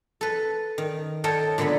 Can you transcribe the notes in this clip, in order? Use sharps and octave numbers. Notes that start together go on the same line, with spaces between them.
A4 B4
D#3
A4 A#4 C#5 D#5 G5 A5
A#2 D3 F#3 B3 B5